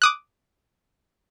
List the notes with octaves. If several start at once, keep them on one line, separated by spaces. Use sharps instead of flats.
D6 D#6 F#6